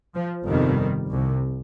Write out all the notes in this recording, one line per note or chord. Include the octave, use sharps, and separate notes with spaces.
F3
G1 F2 C3 D#3 G3
C2 C3